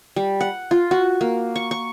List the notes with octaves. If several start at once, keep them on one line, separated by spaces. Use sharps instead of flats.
G3
F#5
F4
F#4
A#3
C#6
C#6